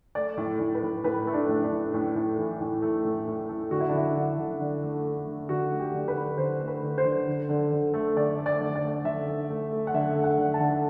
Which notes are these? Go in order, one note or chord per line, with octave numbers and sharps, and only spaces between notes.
A3 D5
A2
A2
B4
A2
A2 B4
A3
D4
A2
D4
A2
A2
A2
E3
A2
A3
A2
A2
A3
D3 F#4
E4
D4
D3 E4
D3
D3
D3
A3
A3
D3
D3 F#4
A3
G4
D3
B4
D3
D3 C5
A3
B4
D3
C5
D3
D3
D3
D3
A3
D3 D5
A3
D5
D3
D5
A3
D3 E5
A3
A3
A3
F#5
D3 E5
A3
F#5
D3
A5
D3